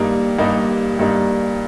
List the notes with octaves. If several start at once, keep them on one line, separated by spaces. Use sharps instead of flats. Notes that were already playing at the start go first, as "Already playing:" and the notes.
Already playing: G2 G3 A#3 D#4
G2 G3 A#3 D#4
G2 G3 A#3 D#4